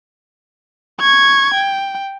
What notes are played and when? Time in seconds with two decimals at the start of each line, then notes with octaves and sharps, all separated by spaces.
1.00 C#6 G#6
1.54 G5